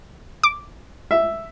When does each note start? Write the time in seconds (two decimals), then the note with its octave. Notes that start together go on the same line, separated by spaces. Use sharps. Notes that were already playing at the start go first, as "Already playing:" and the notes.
0.43 D6
1.11 E5